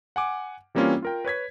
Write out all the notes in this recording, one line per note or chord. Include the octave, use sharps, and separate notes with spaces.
F#5 G#5 D6
E3 G3 A#3 C4 C#4 F4
F4 A#4 G5
B4 C#5 G#6 B6